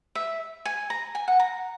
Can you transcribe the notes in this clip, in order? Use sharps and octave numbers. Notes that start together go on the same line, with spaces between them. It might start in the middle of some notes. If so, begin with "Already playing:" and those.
E5
G#5
A#5
G#5
F#5
A#5